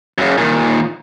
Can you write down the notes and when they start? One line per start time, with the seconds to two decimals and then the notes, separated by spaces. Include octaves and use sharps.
0.18 F#2 C#3
0.38 A#2 D#3